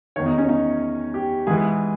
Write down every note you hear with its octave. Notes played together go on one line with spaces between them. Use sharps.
E2 D#3 C#5
D#4
C#4
D#4
G4
G#2 E3 G#4